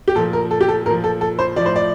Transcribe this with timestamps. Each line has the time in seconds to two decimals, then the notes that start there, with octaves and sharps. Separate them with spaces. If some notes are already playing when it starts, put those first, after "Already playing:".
0.08 G4
0.15 A#2 F3 A4
0.33 A#4
0.51 A4
0.61 G4
0.68 A4
0.86 A#2 F3 A#4
1.04 A4
1.21 A4
1.39 C5
1.56 A2 F3 D5
1.66 C5
1.76 D5